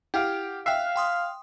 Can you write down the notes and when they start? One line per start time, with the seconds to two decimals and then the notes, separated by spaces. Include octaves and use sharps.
0.14 E4 G4 F5 F#5
0.66 E5 F5 G5 F#6 C7
0.96 G5 C6 D#6